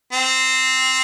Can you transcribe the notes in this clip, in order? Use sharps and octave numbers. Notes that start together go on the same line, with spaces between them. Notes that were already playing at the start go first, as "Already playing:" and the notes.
C4